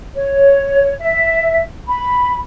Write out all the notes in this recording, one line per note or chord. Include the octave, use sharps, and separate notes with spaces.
C#5
E5
B5